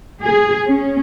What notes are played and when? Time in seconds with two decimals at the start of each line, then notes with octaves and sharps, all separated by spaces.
0.22 G#4
0.67 C#4